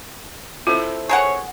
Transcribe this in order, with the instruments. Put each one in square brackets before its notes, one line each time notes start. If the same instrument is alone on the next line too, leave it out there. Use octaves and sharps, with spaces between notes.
[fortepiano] C4 E4 A4 [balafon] F4
[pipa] G#4 A#4 F#5 [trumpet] C#5